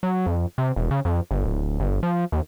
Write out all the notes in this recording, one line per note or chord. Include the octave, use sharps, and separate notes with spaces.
F#3
F2
C3
E1
C#3
F2
G1
D1
G1
F3
D#2